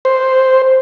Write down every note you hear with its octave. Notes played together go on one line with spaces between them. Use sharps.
C5